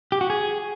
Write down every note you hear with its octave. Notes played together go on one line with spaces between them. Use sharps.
G4
F#4
G#4